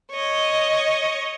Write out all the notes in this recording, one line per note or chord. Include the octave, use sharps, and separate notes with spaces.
C#5 D#5